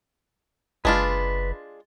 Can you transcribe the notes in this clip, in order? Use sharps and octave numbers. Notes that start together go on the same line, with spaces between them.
F#1 G#3 D4 F4 B4